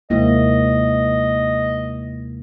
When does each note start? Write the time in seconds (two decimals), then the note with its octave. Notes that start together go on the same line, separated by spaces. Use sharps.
0.10 D#2 C3 G#3 A#3 E4 D#5